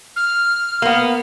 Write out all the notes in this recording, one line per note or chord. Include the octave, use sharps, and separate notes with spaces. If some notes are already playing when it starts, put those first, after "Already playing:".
F6
A#3 B3